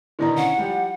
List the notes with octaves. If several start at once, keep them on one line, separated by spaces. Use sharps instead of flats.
B2 D3 D#3 E4 D5 A#5
C#4 F#5
F3 G3 G4